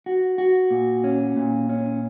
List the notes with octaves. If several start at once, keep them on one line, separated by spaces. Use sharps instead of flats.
F#4
F#4
A#2
C#4
A#2
C#4